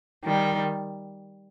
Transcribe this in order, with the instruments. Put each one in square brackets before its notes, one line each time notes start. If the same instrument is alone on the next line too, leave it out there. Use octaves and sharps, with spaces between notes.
[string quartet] D#3 G3